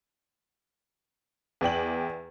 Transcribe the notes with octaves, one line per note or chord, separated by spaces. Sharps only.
E2 D5 G5 F#7